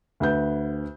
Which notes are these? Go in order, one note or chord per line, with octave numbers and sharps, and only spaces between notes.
D2 B4 G6